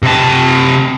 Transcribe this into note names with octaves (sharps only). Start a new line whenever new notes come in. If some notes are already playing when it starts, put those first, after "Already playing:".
C3 A5